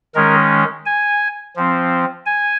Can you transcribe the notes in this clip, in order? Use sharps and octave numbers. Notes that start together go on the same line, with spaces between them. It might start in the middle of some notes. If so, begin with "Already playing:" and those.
D#3 G#3 C#4 A#4
G#5
F3 C4
G#5